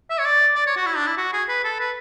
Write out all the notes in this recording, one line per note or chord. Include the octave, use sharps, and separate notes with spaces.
E5
C#5
D5
D5
C#5
F#4
E4
D4
E4
F#4
G#4
B4
A4
B4